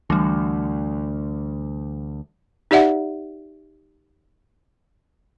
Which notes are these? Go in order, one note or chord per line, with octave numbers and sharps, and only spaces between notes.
D2 E3 G3
D#4 G4 D5 E5 F#5